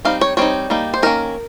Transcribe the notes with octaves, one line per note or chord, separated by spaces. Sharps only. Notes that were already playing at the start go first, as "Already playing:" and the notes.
G3 C4 D#4 F5
C#5
G3 C4 D#4 C#5
G3 A#3 D#4
C5
D#3 A#3 C#4 A#4